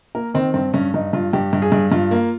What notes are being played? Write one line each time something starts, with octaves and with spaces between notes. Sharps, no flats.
A#3 A#4
D#3 C4
G2 C4
G2 C#4
G2 D#4
G2 F4
G2 G4
G2
G#4
G2
G2 F4
A#3